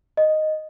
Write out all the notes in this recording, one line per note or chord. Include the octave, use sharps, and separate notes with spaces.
D#5